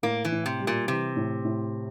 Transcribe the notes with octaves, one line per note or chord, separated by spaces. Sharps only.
A2 A#3
E3
A2
C3
G3
A#2
C3 E3
A2
A2